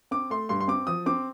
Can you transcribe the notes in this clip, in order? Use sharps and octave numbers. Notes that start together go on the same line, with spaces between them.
C4 D6
A3 C6
G2 C6
C6
C4 D6
F3 D#6
C4 D6